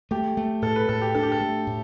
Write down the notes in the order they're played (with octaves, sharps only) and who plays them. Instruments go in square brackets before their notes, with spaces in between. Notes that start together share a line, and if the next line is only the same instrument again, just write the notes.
[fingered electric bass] A3 [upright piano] G4
[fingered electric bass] A3
[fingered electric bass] A2 [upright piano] A4
[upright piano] B4
[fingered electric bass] A2 [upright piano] A4
[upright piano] G4
[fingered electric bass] D4 [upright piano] A4
[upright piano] G4
A4
[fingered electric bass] A3
A2